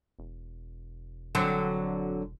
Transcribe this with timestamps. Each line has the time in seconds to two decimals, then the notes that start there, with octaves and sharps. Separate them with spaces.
0.19 E1
1.35 D3 F#3 C4